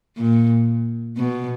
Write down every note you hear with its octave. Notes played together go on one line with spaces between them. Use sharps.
A#2
B2